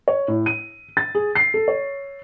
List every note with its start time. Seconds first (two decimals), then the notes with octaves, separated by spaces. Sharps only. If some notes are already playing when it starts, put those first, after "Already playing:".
0.08 C#5
0.28 A2
0.46 D#7
0.97 A6
1.15 G#4
1.35 C7
1.54 A4
1.68 C#5